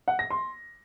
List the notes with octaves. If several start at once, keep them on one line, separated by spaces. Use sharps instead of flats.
F#5
A#6
C6